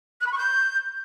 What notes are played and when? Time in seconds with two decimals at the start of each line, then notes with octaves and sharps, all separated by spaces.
0.20 F#6
0.26 B5
0.31 C#6
0.37 G6